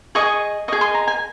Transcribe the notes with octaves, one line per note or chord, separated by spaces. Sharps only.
G#4 D#5 C#6
G#4 D#5 C#6
C6
A#5
G#5